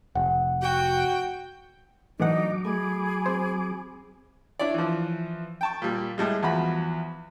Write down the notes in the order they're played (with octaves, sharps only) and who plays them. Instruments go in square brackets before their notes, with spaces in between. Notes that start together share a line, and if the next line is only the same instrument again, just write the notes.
[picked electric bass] F1 [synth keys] F#5
[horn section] F#4 [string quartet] G5
[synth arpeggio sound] A2 E3 F#5 [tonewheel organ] F#3 D6 [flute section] D4 D#4
[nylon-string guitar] A3 A4 G#5 [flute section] G#4 B5
[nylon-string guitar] C4 [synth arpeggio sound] C5
[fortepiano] D4 E4 C#5 D5
E3 F3
G5 A5 C#6
A#2 G3
A2 G3 G#3
E2 F3 F#4 B5